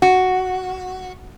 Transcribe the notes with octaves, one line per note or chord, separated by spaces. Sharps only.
F#4